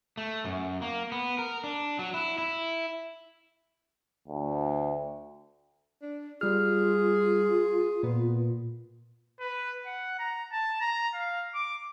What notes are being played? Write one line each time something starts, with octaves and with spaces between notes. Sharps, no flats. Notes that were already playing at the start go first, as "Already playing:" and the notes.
A3
F#2
A#3
B3
A#4
D4
F#3
E4
E4
D2
D4
G3 F4 G#4 F6
A#2 B3
B4
F#5
A#5
A5
A#5
F5
D6